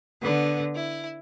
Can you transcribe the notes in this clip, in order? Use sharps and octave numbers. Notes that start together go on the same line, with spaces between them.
D3 B3
E4